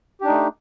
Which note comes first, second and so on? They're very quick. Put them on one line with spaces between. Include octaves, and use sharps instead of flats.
G4 D4 D#4 A3